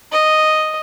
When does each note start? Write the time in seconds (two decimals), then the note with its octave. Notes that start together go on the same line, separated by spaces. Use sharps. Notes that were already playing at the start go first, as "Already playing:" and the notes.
0.12 D#5